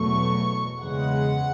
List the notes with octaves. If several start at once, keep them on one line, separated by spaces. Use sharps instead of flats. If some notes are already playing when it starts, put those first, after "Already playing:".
Already playing: E2 B2 F#3 A3 C#6
E2 C#3 G#3 F#5